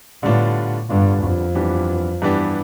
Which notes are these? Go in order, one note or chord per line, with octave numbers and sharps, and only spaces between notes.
A2 D3 G3 B3 D4 F4
G2 D3 G3 B3 D4 F4
F2
G2 E3 B3 D4 G4
G2 E3 B3 D4 G4